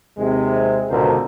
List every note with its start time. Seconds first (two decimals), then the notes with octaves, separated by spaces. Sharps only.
0.18 D#2 C3 G#3
0.89 C#2 G#2 B2 D3 A#4 C5